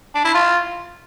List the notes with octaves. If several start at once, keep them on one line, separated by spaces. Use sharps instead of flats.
D4
E4
F4